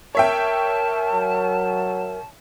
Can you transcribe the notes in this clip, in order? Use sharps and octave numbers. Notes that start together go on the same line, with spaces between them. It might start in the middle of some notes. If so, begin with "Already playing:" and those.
A#4 C#5 E5 G5 A5
F#3